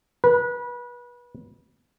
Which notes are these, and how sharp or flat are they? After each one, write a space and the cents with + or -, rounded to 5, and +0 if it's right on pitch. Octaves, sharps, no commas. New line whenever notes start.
B4 -30